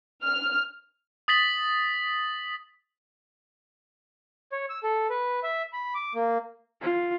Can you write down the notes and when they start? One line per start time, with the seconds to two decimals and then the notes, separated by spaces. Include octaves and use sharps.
0.23 F6
1.28 D#6 A6 B6 F#7
4.52 C#5
4.70 E6
4.83 A4
5.10 B4
5.43 E5
5.73 B5
5.95 D6
6.15 A#3
6.81 F4